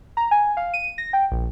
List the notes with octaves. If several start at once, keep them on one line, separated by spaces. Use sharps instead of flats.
A#5
G#5
F5
D#7
A#6
G5
A#1